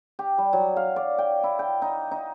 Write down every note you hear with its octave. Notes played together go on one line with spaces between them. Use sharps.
G4
G3
F#3
F5
D5
G5
E4
G5
D#4
D#4